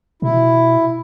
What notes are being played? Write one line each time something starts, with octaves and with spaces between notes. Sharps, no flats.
B2 E4